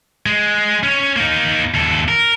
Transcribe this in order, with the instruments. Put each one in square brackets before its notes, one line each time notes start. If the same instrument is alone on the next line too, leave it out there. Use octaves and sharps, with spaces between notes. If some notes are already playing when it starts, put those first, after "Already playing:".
[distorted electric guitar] G#3
C#4 C#5
A#3 D#4
D#2 A4
A#4